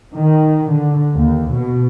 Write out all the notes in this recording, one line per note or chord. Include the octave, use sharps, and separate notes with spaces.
D#3
D3
D#2
B2